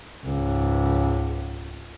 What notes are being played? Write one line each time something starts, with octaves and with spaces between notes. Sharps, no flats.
C#2 G#2